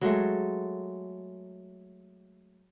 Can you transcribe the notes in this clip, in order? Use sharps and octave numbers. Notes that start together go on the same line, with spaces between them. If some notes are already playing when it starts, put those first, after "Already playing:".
F#3 G#3 A3